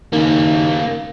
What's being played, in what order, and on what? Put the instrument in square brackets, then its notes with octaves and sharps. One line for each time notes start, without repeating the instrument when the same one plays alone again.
[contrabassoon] D#2 [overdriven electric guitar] C#3 A#3